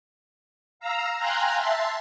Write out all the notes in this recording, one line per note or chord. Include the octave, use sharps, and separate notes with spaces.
F5 A#5 E6
F5 G5 G#5 A#5 C6 F#6
E5 A5 C6